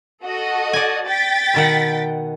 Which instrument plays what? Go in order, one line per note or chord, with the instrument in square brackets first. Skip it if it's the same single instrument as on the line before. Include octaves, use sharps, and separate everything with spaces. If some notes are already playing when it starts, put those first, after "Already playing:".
[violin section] F#4 A4 D#5
[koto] D5 G#5
[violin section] G5 A6 B6
[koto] B2 D#3 F#5